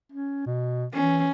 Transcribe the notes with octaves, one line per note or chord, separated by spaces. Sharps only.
C#4
B2
E3 C#4